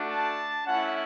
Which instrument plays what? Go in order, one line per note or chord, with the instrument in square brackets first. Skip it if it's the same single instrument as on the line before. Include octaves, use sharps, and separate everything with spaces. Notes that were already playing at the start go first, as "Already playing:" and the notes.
Already playing: [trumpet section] A3 D4 F#4
A5
A3 C#4 E4 F#5